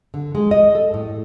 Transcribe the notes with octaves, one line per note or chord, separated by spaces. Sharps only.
D3
G#3
D#5
A4
A2